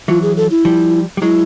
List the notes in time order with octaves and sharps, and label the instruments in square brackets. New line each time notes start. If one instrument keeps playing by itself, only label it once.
[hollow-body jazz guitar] E3 F#3 [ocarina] F4
[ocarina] G#4
A4
E4
[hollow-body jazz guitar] F3 G3
G3
[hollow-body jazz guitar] F#3 G#3 [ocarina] E4